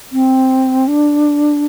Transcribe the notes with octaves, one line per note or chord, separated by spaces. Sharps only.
C4
D4